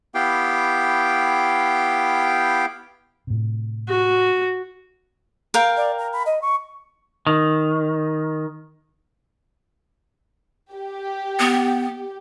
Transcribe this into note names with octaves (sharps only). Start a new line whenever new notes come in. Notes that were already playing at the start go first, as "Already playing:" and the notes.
B3 E4 G4 F5 G5 D6
A2 C3
F#4
A#4 F5 G5
D5
A#5
B5
D#5
C#6
D#3
G4
B3